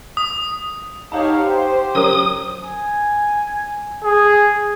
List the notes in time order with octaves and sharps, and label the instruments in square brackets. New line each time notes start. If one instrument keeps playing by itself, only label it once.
[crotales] D#6
[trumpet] D#4 [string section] G4 C#5 F5 [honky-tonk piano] F#5 A5
[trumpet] G4 [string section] C5
[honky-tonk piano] F#3 C#4 A#4 [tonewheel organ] D#6
[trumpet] G#5
G#4